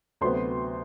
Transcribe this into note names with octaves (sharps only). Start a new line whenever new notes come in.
D2 C3 F#3 B3 C5 C6